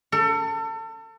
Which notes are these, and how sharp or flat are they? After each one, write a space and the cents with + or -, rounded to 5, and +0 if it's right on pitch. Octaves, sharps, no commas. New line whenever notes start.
A4 +35